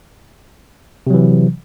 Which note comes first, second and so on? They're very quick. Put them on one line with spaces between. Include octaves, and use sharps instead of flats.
C3 F#3 E3